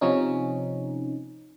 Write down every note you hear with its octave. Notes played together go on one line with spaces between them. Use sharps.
C3 F3 C#4 D#4